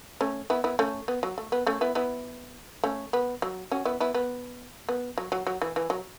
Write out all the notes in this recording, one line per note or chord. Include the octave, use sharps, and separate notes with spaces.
A3 C#4
B3 E4
B3 E4
A3 C#4
B3
F#3
A3
B3
A3 C#4
B3 E4
B3 E4
A3 C#4
B3
F#3
C#4 F#4
B3 E4
B3 E4
B3
B3
F#3
F#3
F#3
E3
E3
F#3